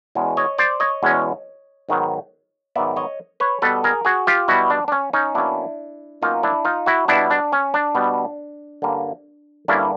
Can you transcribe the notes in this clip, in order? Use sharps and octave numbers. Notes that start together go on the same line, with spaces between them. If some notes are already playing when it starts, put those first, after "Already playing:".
E2 B2 G#3 C#4
C#5 D#5
C5 D5
C#5 D#5
E2 B2 G#3 C#4
G#2 D#3 F#3 B3
G#2 D#3 F#3 B3 D5 E5
C#5 D#5
B4 C#5
B2 G3 B3 A4 B4
G#4 A#4
F#4 G#4
F4 G4
B2 G3 B3 E4 F#4
D4
D4
C#4
C#4 D#4
B2 F#3 A#3 C#4 D4 E4
B2 F#3 A#3 C#4 D#4 F4
D4 E4
D#4 F4
E4 F#4
B2 G3 B3 D4 E4
D4
C#4
D4
B2 G3 B3
G2 D3 G3 A#3 C#4
G2 D3 G3 A#3 C#4 D4 E4